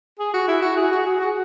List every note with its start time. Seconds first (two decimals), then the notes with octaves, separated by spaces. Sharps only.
0.19 G#4
0.34 F#4
0.48 E4
0.62 F#4
0.77 G#4
0.92 F#4
1.06 G#4
1.20 F#4